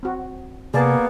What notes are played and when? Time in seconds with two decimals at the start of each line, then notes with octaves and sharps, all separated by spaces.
0.03 C4 F#4
0.74 C3 A#3 B3 G#4 D5 A5